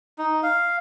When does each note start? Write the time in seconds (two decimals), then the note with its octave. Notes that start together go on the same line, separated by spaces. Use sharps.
0.18 D#4
0.43 F5